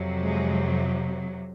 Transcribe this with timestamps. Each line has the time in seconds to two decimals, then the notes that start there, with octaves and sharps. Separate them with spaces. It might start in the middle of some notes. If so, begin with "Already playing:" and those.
Already playing: F2 C3 F#3
0.23 G#3